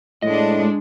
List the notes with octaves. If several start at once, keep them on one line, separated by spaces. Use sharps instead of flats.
A2 G#3 D4 D#5